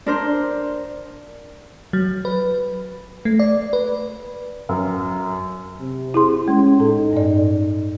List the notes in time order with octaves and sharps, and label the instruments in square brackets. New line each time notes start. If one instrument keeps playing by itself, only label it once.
[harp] D4 A#4 C5
[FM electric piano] F#3
B4
A3
D5
B4
[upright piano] F#2
[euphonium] C3
[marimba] E4 G#4 C6
[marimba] G#3 [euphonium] C#4
[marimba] A2 A4 [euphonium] D#4
[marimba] G2 D5